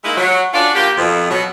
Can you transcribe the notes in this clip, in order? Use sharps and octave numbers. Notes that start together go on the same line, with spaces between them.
G#3 A#3 D#4 E4
F#3
C#4 D4 F4 F#4 A4 D5
D3 A#3 F4 G4
F2 B2
B2 F#3 F#4